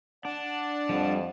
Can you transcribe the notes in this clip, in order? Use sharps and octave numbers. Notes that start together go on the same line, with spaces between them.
D4 D5 F#5 A5
F2 F3 G3